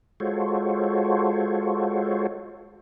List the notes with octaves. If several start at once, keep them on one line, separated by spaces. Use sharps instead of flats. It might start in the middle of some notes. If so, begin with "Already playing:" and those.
G#3 F4 F#4 A4 C5 C#5